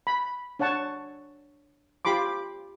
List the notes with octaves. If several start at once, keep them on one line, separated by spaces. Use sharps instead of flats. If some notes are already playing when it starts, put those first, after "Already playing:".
B5
D4 C#5 F#5 A5 C#6
F4 G4 B5 C6 D6